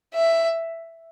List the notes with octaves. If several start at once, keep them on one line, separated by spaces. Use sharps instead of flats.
E5